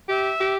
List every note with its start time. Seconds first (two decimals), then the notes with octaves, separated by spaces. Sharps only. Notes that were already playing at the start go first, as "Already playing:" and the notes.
0.09 G4 E5
0.40 G4